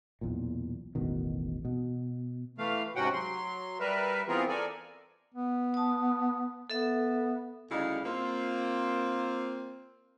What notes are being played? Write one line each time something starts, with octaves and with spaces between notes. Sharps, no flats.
B1 E2 A#2
E1 A1 B2 D#3
B2
E3 A3 F5
G#2 C3 C#4 F#4 F#5 G5
F#3 C6
G3 A#4 B4 E5
E3 B3 C4 F4 G#4 A#4
A4 A#4 D5 G#5
B3
A5 D#6
B3 A4 E5
D2 C#3 G3 D#4 E4 F5
A#3 C4 F4